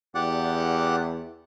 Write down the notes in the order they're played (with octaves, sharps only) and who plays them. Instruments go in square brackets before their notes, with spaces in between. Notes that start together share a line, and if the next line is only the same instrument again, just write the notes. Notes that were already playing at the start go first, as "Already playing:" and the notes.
[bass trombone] E2 [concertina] G4 D5 F#5